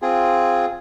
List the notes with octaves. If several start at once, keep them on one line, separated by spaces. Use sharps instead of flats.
C4 F4 G#4